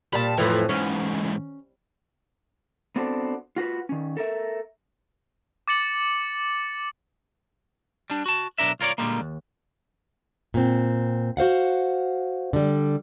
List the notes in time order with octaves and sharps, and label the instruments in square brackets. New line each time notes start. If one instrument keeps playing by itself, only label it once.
[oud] A#2 G3 [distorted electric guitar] A5 B5
[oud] F2 A2 E3 [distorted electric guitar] F3
[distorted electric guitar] G#2 E3 [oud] C#4
[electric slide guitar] B3 C4 D4 F#4 A4 C5
F4 F#4 A#4 B4
D#3 C#4
A4 A#4 E5
[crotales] D6 A6 C#7 F#7
[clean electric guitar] G3 D4
F#4 A5
B1 C3 D4 A#4 E5
C2 F4 A#4 C#5 D5
A#2 D3 G3 G#3 A#3
D#2
[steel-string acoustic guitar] A#2 C4
F#4 C5 F5 F#5
D3 G3